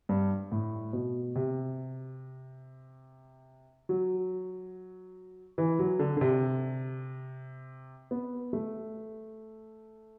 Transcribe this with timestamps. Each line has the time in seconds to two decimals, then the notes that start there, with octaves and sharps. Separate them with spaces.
0.09 G2
0.52 A2
0.93 B2
1.35 C3
3.89 F#3
5.58 E3
5.79 F#3
5.99 D3
6.17 D3
6.21 C3
8.11 B3
8.53 A3